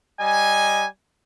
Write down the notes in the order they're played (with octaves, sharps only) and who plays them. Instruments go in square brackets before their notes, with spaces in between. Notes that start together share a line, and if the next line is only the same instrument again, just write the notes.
[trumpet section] G3 D#5 G#5